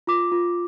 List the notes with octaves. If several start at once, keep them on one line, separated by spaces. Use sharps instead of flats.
F4 D6
F4